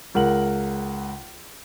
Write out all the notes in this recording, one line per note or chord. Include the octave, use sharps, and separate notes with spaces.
C#2 A#4 F#5 F#7